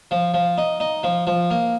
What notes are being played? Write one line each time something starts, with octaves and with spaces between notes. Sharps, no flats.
F3
F3
D#4
D#4
F3
F3
A#3